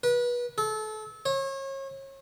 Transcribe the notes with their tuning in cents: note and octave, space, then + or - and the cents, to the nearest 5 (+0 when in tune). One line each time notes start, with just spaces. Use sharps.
B4 -30
A4 -30
C#5 -35